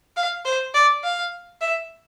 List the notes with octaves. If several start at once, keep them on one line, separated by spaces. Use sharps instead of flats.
F5
C5
D5
F5
E5